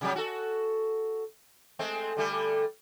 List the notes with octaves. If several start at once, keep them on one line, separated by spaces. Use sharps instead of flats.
C3 F#3 G3
F#4 A4
G#3 A3 C4
D3 G3 A3